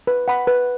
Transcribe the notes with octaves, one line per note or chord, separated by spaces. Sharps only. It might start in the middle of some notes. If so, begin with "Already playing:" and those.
B4
F#5 B5
B4